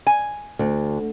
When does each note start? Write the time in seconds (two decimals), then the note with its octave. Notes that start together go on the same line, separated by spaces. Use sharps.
0.07 G#5
0.59 D2